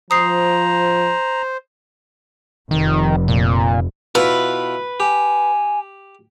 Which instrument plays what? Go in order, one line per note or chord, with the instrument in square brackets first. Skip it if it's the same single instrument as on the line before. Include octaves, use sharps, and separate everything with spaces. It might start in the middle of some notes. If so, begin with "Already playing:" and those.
[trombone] F3 [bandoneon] C5 [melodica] A#5 [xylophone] D#6 C7
[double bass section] F1 [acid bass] D#3
[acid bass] A#2
[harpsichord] B2 E4 F4 [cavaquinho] B4
[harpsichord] G4 [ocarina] G#5